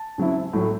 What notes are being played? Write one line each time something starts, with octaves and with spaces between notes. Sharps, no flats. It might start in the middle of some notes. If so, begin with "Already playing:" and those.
Already playing: A5
C#3 F#3 C4 E4
A2 F#3 A3